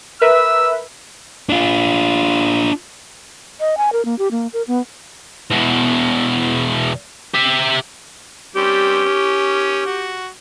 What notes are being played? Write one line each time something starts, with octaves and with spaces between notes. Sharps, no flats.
A#4 B4 E5 E6
D4 F4
D#5
G#5
A#4
A#3
G4
A#3
A#4
B3
E2 B2
G4 E5
G3 C4 C#4 G4
C#4
F#4